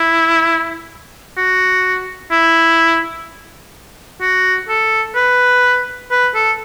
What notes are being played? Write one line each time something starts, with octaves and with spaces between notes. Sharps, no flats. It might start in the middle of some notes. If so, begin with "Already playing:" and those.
Already playing: E4
F#4
E4
F#4
A4
B4
B4
A4